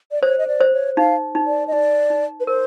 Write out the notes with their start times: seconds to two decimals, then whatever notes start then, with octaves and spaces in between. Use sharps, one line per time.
0.11 D5
0.23 C5 C#5
0.38 D#5
0.48 D5
0.60 C5
0.73 C#5
0.97 D#4 F5
1.35 D#4
1.47 D5
1.68 D#5
1.72 D#4 D5
2.10 D#4
2.40 B4
2.47 A#4 C5